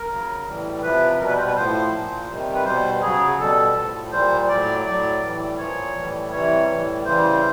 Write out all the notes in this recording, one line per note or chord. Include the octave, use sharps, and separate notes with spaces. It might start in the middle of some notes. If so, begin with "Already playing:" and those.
Already playing: A#4
C#3 F#3
A2 E3 G3
C3 F3 B4
B2 G3 A#4
B4
C5
B4
A2 F3 C5
A#2 F3
C3 D#3 G3
B4
B2 G3 C5
C#3 F#3 G#4
B2 G3 A4
A2 F3
A#2 G3 C5
A2 F#3 D5
A2 F#3 D5
A2 E3 G3
A#2 F3 C#5
A2 E3 G3
C3 E3 G3 C#5
A2 E3 G3
C#3 E3 G3 C5